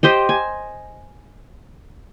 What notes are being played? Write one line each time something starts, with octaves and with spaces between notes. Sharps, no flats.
G4 C5 D#5
G#5